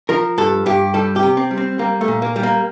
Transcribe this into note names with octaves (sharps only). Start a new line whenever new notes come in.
F3 A#4
G2 A4
G2 G4
G3 A4
G4
C3
C4
G3
C4
G3 A#3
A3
A#2
A#3
G3
A#3